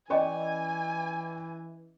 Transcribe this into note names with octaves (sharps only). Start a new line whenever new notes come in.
E3 C#4 D5 D#5 G5 G#5 C#6